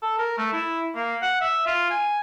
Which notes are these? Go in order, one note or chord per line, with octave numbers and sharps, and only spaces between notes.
A4
A#4
A3
E4
A#3
F#5
E5
F4
G#5